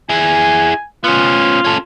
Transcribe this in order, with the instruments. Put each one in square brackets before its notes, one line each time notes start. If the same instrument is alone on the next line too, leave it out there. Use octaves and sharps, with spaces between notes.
[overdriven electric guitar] E4 G#4 [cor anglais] G#5
[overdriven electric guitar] B3 C#4 [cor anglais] F4
[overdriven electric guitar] C#4 A4